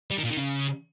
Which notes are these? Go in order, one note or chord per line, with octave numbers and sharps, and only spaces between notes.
G3
D#3
A#2
D#3
C#3